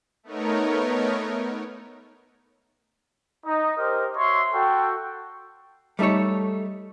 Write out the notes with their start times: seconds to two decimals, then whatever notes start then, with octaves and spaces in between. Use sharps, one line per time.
0.23 A3 B3 D#4 A#4 C#5
3.46 D#4 D#5
3.77 G4 A#4 C5 D#5
4.16 F#4 C#5 E5 C6
4.54 F#4 A4 G5
5.99 G3 A3 D#4 A4 C#5